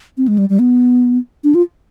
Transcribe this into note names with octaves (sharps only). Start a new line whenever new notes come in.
C4
G#3
G3
G3
B3
D4
F4